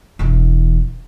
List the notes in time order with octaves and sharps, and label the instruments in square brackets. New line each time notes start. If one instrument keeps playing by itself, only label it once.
[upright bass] E1 E3